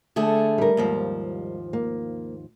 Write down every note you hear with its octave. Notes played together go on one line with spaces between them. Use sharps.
D3 A3 G#4
G3 A#4
D#2 G#2 F3
A#3